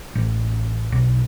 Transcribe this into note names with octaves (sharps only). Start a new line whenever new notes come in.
A1
B1